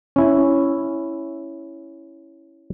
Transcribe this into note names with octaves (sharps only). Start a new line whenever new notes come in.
C#4 E4